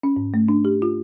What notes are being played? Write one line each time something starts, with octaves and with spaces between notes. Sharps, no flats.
C#4
G#2
A3
D4
G4
F4